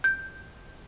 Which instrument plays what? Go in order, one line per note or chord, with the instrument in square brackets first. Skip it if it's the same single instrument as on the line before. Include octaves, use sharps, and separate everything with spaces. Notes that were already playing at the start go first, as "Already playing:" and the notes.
[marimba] G6